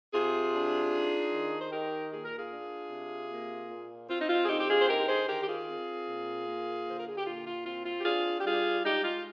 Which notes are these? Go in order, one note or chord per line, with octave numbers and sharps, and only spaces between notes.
C3 F4 G#4
D4
D#4
D#3
C5
D#4 G4 A#4
A#2 G#4
A#4
F4 G#4
D4
C3
A#3
A#2
C4 F4
D#4
F4
G#4
D3 D#4 G4
G4
F4 G#4
C5
D#4 G4 A#4
G#4 C5
D#3 G4 A#4
G4
F4 G#4
C4
A#2
A#3
D3 C5
A#4
G#4
G4
A#2 F4
F4
C4 F4
F4
G4
D4 F4 G#4
G4
G3 F4 G#4
G#3 D#4 G4
F4